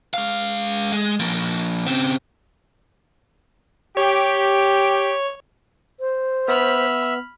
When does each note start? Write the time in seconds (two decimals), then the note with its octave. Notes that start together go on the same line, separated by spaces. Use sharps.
0.14 G#3 F5
0.92 G#3
1.20 F3 A#3
1.87 C#3 C4
3.97 G4 C#5
6.00 C5
6.48 B3 E5 B5 F6